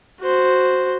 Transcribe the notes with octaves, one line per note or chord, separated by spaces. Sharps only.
F#4 C5